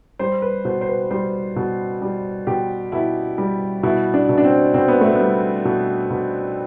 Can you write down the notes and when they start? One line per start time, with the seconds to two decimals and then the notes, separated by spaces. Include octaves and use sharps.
0.19 G3 C5
0.42 B4
0.65 B2 C5
0.81 C5
0.88 B4
1.11 G3 C5
1.56 B2
2.02 G3
2.47 B2 G4
2.92 B2 E4
3.38 G3
3.83 B2 E4
4.14 D4
4.29 B2
4.38 D4
4.44 C4
4.74 B2 C4
4.88 B3
5.01 A3
5.15 G3 B3
5.65 B2
6.10 B2